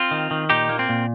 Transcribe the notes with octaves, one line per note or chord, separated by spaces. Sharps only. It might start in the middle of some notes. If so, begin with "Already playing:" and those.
Already playing: C4 F4
D#3
D#3
A#2 D#4 G4
A#3
C4
A#2